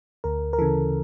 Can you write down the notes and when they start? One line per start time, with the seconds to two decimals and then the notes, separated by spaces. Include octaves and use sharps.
0.24 D2 A#4
0.53 A#4
0.59 C#3 E3 A4